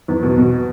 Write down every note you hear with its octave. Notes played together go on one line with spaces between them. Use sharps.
E2
B2
B2